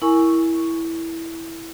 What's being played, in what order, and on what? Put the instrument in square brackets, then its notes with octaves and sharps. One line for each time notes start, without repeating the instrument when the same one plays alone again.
[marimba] E4 A#4 G#5 C#6